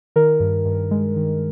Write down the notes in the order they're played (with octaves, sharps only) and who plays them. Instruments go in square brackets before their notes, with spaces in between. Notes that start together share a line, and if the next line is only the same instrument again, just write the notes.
[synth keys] D#3 A#4
G2
G2
G#3
D#3